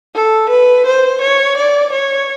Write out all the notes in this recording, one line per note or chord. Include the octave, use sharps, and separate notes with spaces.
A4
B4
C5
C#5
D5
C#5